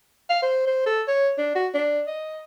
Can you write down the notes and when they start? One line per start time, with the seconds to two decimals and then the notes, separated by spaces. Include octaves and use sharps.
0.30 F5
0.42 C5
0.67 C5
0.86 A4
1.08 C#5
1.38 D4
1.55 F#4
1.74 D4
2.07 D#5